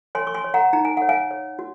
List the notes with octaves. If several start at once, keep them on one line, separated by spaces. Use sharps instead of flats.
C#5 G#5 C6
C#6
G#5 C6
C#5
F#5 A#5
D#4 A#5
G#5
C#5 F#5
F5 G#5
C#5
F#4